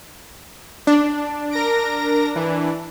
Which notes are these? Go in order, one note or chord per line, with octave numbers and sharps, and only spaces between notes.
D4
A#4 A#6 D7
E3